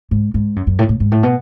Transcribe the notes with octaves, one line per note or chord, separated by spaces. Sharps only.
G#2
G#2
F#2
F#2
A2
A2
G#2
A2
B2